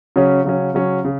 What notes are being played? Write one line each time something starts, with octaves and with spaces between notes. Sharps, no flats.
C#3 F#3 C#4
C#3 F#3 C#4
C#3 F#3 C#4
C#3